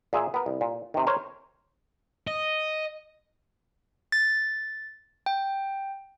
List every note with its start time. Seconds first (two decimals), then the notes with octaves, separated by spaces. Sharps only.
0.13 A#2 G#4 E5
0.34 B3 A#4
0.46 C2
0.61 A#2
0.94 C3 D#3
1.07 A#4 C5 C#5
2.27 D#5
4.12 A6
5.26 G5